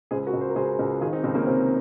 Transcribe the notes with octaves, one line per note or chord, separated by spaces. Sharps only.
C#2 G#4 C5
F#4 A#4
C#2
C5
A#4
C#2 G#4 C5
C#2
D#3 F4 G#4
C4 D#4
C#2 C4 D#4
A#3 C#4
C3 C4